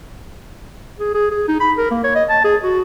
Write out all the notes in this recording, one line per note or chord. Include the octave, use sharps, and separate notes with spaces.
G#4
G#4
G#4
D#4
B5
A#4
A#3
C#5
D#5
A5
G#4
F#4